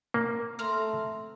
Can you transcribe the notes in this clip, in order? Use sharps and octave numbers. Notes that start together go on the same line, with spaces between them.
A#3
A3 C4 A#5 F6